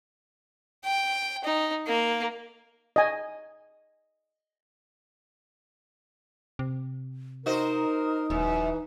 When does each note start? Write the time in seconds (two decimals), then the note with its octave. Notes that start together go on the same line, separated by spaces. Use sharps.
0.85 G5
1.44 D#4
1.87 A#3
2.96 D#5 G#5
6.59 C3
7.46 D#4 F#4 A#4 C5 D#5
8.30 D#1 F#2 E3